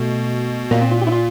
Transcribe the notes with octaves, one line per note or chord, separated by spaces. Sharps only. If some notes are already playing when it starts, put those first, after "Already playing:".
Already playing: B2 A3
A#2 A#3
C4
F4
G4
E4
F4